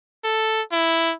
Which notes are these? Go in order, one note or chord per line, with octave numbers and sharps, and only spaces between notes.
A4
E4